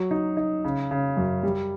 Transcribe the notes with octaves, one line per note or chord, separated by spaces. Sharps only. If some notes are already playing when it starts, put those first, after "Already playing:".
Already playing: F#3
D#4
D#4
C#3
C#3
F#2
G3